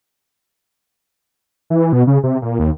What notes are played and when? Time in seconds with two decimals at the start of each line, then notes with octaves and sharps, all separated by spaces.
1.70 E3
1.93 B2
2.07 C#3
2.23 C3
2.42 A#2
2.59 D#2